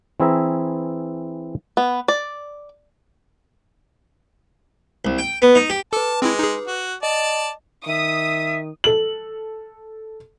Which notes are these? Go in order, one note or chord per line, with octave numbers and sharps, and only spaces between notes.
E3 C4 E4 G#4 E5 A#5
B3
D5
C2
G5
B3
D#4
G4
A4 B4 A5 D6
G#3 C4 E4
D#4 G#4
F#4
D5 D#5 A5
D#3 E5 D#6
A4 F#7